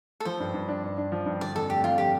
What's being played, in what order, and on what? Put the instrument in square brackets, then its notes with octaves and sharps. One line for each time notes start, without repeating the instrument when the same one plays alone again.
[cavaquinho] A4
[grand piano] F3 [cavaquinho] C5
[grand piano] G2
G2
D4
G2
D4
F3
G2
[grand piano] D3 [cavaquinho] D5
[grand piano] F2 [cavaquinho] A4
[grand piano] A3 [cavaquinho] G4
[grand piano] F2 [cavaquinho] F4
[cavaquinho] G4